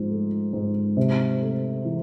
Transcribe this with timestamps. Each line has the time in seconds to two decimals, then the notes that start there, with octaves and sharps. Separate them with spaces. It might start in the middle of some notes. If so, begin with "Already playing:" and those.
Already playing: G#2 F3
0.10 A3
0.53 G#2
0.97 C3
1.41 A3
1.85 E3